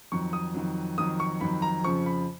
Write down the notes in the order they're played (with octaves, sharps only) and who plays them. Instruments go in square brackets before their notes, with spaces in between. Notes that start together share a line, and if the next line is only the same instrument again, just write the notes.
[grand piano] F2 D#3 F#3 C#6
D#6
F2 D#3 F#3
F2 D#3 F#3 D#6
C#6
F2 D#3 F#3 B5
A#5
F2 C#3 F3 C#6
B5